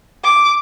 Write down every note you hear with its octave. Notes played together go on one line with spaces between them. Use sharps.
D6